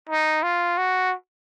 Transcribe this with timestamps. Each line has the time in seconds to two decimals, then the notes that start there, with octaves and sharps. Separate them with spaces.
0.10 D#4
0.43 F4
0.78 F#4